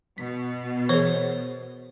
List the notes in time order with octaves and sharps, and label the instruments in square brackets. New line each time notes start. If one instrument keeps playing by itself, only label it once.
[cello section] B2 [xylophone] B6
[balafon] E3 G#4 [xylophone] A#4 C5 C#5